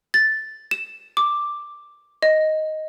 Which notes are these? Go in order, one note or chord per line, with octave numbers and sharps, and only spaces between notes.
A6
E7
D6
D#5